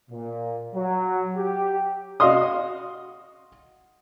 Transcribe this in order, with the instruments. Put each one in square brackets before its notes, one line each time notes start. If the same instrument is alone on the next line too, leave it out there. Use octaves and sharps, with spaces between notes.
[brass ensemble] A#2
F#3
G4
[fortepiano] F#4 D#5 F5 C6 D#6